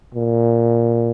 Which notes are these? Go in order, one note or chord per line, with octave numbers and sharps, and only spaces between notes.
A#2